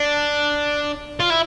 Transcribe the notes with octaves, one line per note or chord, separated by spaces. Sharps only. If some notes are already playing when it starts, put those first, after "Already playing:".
Already playing: D4
F4
E4